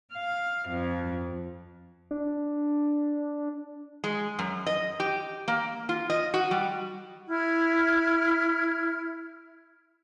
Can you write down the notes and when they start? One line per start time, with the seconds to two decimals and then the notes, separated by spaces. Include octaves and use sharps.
0.14 F5
0.69 F2
2.11 D4
4.04 G#3
4.39 F#2
4.67 D#5
5.00 G4
5.48 A#3
5.89 F4
6.10 D#5
6.34 F#4
6.51 G3
7.28 E4 F6 G#6